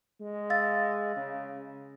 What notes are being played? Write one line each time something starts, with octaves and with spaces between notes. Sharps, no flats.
G#3
F5 E6 A6
C#3